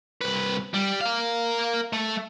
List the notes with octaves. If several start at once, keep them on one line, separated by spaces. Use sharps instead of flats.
C2 B4
G3
A#4 F5
A3